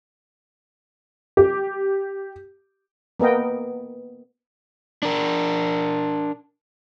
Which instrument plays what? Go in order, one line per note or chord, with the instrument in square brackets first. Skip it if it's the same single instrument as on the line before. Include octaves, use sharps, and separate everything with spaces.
[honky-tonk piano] G4
[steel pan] A#3 B3 A#4 D#5 G5
[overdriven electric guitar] D4 A#4